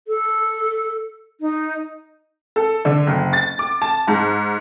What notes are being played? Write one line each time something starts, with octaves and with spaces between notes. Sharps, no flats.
A4
D#4
A4
D3
F#1
A6
D6
A5
G#2